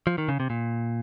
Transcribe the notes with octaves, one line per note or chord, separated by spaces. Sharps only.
F3
D#3
C#3
C3
A#2